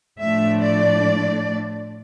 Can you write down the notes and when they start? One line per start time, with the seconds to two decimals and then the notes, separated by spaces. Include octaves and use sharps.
0.18 A2 F3 A3 D4 E5
0.61 D5